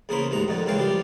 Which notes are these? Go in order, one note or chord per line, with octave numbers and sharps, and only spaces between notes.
E2 C#3 A#3 A#4 C5 B5
A1 D#2 G#2 A#5
F2 D3 D#3
F#2 C#3 E3 G#3 F5 G5
F3 G3 G4